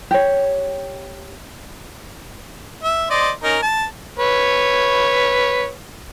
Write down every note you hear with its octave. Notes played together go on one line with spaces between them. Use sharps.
G4 C#5
E5
C5 D5 D#5
C#4 D#4 A#4
A5
B4 C#5